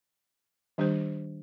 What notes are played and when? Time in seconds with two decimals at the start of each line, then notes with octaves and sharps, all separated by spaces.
0.78 D#3 G3 D4 G4 C5